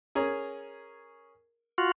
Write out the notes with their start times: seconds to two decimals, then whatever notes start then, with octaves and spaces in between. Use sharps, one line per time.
0.15 C#4 G#4 A#4
1.78 F4 F#4